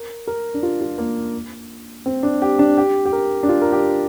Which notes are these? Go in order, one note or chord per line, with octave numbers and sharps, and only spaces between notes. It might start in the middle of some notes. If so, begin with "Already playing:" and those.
Already playing: A#4
A#4
D4
F4
F4
A#3
C4
D4
G4
D4
G4
G4
A#4
D4
F4
A#4
G4